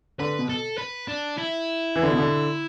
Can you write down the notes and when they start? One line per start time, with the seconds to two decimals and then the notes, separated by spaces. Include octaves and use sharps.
0.19 D3 B4
0.39 B2
0.49 A4
0.78 B4
1.08 D4
1.37 E4
1.96 E3
2.03 D3
2.11 B2
2.19 D3